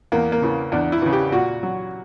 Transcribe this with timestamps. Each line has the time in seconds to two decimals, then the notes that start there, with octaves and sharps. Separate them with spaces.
0.12 E2 A#3
0.32 A#3
0.42 C#3 E3
0.72 E2 D4
0.92 E4
1.02 C#3 E3
1.13 G4
1.32 A#2 F#4
1.63 F#3